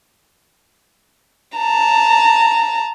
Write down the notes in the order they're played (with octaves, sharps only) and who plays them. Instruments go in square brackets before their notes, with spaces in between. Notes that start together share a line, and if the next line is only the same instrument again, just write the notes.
[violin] A5 A#5